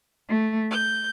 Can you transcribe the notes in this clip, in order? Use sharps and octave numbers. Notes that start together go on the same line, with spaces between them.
A3
G6